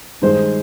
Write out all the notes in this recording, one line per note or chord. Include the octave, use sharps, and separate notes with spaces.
G2 D#3 G#3 C5